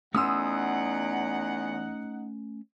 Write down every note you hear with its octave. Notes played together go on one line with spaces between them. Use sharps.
E2 A3 C#4 D#4 F#5 C6 D#6 E6